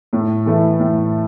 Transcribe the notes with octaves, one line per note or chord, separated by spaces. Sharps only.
A2
E3 A3 E4
A2